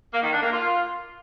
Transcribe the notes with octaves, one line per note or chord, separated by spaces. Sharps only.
A#3
D#3
D4
A#3
F4